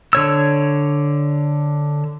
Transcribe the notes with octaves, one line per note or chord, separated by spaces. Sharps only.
D3 C#5 E6